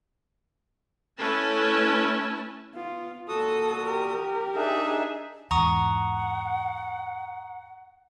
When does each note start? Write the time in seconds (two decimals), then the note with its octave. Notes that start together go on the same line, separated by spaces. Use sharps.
1.18 A3 C#4 E4 B4 G#5 A5
2.75 B3 F4
3.28 A#2 F#4 A4 D#6
3.86 G4 A#4
4.56 D4 D#4 G#4 E5
5.51 E2 G#2 F#5 A#5 C#6 D#6